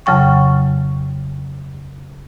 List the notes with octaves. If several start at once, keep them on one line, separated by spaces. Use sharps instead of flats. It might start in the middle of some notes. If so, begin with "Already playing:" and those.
F2 C#3 F#3 G5 C#6